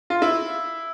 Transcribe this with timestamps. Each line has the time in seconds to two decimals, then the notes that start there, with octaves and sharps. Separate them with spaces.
0.10 F4
0.22 E4